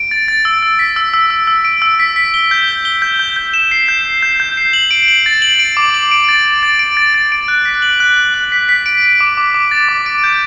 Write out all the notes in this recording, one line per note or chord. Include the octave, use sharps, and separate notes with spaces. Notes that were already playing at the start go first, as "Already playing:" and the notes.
Already playing: D7
A6
A6
E6
E6
B6
E6
E6
E6
E6
D7
E6
B6
B6
G7
G6
G7
G7
G6
G6
G6
E7
C7
G6
G6
G6
G6
C7
F#7
D7
F#7
A6
F#7
D7
D6
F#7
D7
A6
A6
A6
D7
A6
A6
D7
F#6
B6
F#7
F#6
F#6
F#6
B6
B6
D7
D7
D6
D6
D6
A6
D6
D7
G6